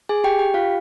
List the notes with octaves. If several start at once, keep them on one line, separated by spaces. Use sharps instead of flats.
G#4 G#5
G4 G5
G4 G5
F4 F5